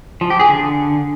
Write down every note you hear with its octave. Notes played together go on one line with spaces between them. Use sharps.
F3
G4
G#4
D3